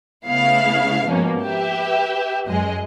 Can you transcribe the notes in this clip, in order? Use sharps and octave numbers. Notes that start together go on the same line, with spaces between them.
C#3 A3 B3 E4 F5
G#2 B2 F3 A#3 C#4
G4 B4 E5
F#2 G#3 D#5